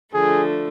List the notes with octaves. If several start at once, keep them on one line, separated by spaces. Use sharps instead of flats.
D3 F3 A3 G#4